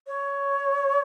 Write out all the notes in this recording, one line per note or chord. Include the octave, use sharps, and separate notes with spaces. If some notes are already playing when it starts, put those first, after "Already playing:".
C#5